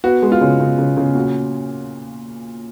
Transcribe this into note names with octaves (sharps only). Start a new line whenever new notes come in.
B3 F#4
G#3
F4
C#3
C#3
C#3
C#3
A#2 F#4